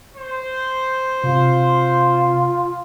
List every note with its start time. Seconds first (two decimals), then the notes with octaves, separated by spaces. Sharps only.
0.16 C5
1.24 C3 F4